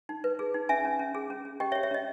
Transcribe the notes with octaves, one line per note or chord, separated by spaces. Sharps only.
D#4
B4
G#4
D#4
C#4 E5 G#5
C#4
C#4
G#4
C#4
C#4
G4 D#5 G5
C#5 E5
G4
C#5 E5
C#4 D#5